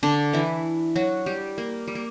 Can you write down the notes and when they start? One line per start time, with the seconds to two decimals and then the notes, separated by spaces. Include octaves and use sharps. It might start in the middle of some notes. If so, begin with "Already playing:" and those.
0.03 D3 D4
0.33 E3 E4
0.96 F#3 F#4
1.26 G3 G4
1.58 A#3
1.87 G3
1.95 A#3